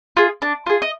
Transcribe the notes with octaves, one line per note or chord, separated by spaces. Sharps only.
F4 G#4
D4
F4 G#4
D#5